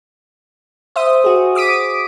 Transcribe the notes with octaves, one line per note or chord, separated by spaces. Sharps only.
C5 E5 D#6
F#4 G#4
D6 D#6 B6 D7 D#7